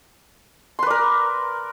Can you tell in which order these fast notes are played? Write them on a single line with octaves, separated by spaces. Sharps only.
C6 B4 D5 A#4